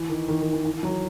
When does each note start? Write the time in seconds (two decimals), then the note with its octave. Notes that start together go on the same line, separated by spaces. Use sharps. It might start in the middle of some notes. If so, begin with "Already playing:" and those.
Already playing: E3
0.09 D#3
0.28 D#3
0.41 D#3
0.53 E3
0.65 E3
0.83 F#3